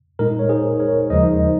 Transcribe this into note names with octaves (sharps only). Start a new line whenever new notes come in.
A#2 G#3 D#4 A#4
C#5
G#4 C5
A#4 C#5
D#2 C#3 F3 G#3 D#4 C5 D#5